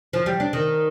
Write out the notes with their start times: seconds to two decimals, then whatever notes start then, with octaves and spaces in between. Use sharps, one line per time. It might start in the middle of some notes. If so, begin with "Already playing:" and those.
0.13 F3
0.26 G3
0.40 D4
0.53 D#3